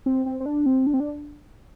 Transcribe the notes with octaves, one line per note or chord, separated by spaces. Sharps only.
C4
C4
C4
D4
C4
D4
C4
D4